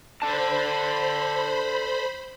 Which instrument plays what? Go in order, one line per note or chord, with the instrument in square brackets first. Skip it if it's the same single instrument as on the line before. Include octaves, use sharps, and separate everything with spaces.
[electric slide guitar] A4 D5 A5 [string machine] C5 B5